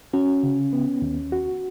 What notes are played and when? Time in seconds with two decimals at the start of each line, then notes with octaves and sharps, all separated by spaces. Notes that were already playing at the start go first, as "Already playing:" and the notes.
0.13 C#4 F#4
0.43 C#3
0.73 B3
1.02 D#2
1.32 F#4